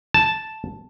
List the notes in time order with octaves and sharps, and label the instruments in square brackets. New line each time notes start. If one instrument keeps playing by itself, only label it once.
[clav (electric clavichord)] A5